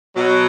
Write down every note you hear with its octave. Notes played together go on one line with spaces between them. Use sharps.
B2 F#3